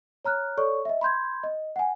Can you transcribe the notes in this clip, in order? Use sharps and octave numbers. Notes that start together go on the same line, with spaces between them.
C#5 A#5 F6 F#6
A4 C#5 D5 C#6
D#5 E5
B5 C6 G6 G#6
D#5
F#5 G#5